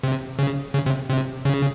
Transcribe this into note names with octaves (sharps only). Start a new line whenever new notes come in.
C3
C#3
C#3
C3
C3
C#3